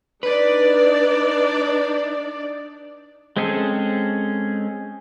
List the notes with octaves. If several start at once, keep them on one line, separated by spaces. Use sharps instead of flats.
D4 D#4 B4 D5
G#3 C4 C#4 G#4 A4